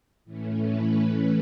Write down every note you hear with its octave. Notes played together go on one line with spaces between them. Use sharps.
A2 E3 A3 C#4
B4